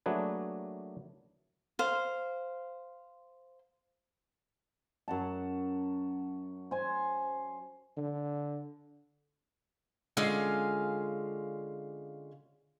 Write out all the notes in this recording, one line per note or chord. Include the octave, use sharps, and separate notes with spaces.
F#3 A3 A#3 D4 G#4 B4
C5 F5
F#2 F#5 A5
C5 G#5
D3
D3 G#3 C#4 F4 F5